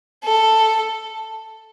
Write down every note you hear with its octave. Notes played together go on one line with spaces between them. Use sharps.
A4